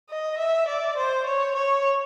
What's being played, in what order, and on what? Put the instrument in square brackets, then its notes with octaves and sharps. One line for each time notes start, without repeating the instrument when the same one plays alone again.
[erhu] D#5
E5
D5
C5
C#5
C#5